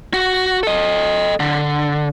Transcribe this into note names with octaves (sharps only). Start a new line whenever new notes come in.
F#4
A4 D#5
D3